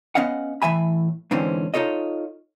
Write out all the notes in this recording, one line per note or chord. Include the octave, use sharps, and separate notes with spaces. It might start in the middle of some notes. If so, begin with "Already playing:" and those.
B3 C#4 D#5 F5 F#5
A2 E3 E5 G#5 B5
G#2 D3 E3 C4 C#4
D#4 F4 A4 C#5 D#5